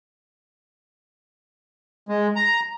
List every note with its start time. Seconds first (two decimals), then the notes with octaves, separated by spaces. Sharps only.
2.09 G#3
2.36 A#5